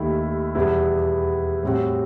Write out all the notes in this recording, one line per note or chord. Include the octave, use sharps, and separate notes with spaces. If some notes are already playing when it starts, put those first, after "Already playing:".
Already playing: D#2 D#3 A3 E4 G4
E2 B2 G3 B3 E4
A2 G3 C4 F#4